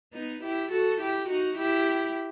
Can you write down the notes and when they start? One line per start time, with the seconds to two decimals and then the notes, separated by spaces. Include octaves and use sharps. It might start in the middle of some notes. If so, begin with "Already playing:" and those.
0.13 B3 D#4
0.43 E4 G4
0.71 F#4 A4
1.01 E4 G4
1.28 D#4 F#4
1.57 E4 G4